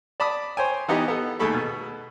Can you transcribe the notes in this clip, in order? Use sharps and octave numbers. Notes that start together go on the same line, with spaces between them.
D5 A5 B5 D6 D#6
C5 C#5 G5 G#5
E3 B3 D#4 G4
B3 A4
D#2 A3 G#4 A4 B5 C#6
B2